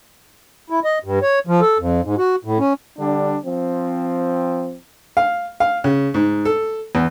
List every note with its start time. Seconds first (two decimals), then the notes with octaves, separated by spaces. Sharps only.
0.70 E4
0.84 D#5
1.04 G2
1.22 C#5
1.47 F3
1.61 A4
1.79 F2
2.04 G#2
2.18 F#4
2.45 A2
2.59 C#4
2.99 D3 G3 D4
3.45 F3 C4
5.17 F5
5.60 F5
5.84 C#3
6.14 G#2
6.45 A4
6.95 E2